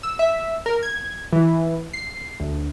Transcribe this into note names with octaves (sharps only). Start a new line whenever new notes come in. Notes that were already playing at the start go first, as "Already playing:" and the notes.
E6
E5
A#4
G#6
E3
C7
D2